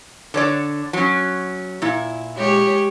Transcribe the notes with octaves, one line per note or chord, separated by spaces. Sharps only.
D3 C#5 D5
F#3 C#4
A#2 E4
G#3 G4 C#5